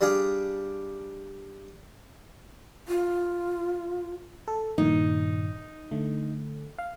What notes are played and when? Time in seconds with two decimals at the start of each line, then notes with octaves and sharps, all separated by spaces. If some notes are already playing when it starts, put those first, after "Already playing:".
0.01 G3 D4 G#4 F5
2.88 F4
4.48 A4
4.78 G2 A#2 D#3 D#4
5.91 D3 A3
6.78 F5